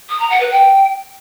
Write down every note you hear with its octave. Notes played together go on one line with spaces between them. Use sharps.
D#6
A#5
F#5
B4
G5